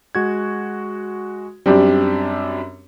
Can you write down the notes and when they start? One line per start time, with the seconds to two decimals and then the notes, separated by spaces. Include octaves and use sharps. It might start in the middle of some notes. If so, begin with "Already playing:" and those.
0.15 G#3 F#4 G#6
1.66 F#2 G3 C4 D4 G4